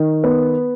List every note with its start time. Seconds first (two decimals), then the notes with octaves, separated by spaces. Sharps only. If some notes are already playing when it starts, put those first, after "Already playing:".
Already playing: D#3
0.24 B3